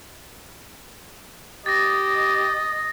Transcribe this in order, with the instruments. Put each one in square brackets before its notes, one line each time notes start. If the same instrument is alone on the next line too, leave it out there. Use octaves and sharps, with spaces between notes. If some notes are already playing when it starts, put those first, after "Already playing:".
[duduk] G4 [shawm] D#5 [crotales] A6 A#6